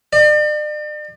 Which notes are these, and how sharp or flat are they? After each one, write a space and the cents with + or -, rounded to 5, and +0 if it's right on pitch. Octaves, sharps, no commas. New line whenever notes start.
D5 +40